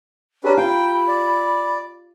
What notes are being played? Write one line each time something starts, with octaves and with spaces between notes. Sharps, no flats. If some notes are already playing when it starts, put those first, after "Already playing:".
C#4 D4 G4 B4 A#5
F4 G5 B5
D5